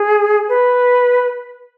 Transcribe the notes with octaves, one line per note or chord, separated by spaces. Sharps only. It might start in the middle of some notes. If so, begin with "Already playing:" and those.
Already playing: G#4
B4